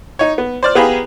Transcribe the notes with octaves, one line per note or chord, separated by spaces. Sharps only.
D#4 C#5
B3
C5 D5 F6
B3 G4 G#4 F5 A#5 B5